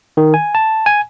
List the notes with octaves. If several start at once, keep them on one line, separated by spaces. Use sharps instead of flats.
D#3
G#5
A5
G#5